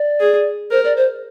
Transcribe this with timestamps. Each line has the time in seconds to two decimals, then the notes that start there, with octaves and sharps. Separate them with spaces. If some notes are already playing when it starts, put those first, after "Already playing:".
Already playing: D5
0.20 G#4
0.71 A#4 C5
0.84 D5
0.97 C5